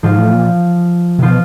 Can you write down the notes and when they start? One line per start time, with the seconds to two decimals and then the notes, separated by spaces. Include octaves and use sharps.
0.03 G#2 F3 F4
0.18 A2
0.33 A#2
1.19 C3
1.22 B2 F3 F4